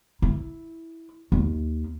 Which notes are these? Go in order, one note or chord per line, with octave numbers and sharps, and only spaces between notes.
E4
D#2